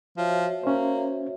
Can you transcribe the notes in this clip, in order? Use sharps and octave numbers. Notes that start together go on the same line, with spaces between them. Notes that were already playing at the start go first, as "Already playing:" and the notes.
F3 F#4 C#5 E5
A#3 C#4 C5